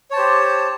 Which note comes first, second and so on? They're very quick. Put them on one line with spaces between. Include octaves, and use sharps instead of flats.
C#5 A5 C5 G4